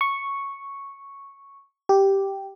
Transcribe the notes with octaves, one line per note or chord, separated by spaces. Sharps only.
C#6
G4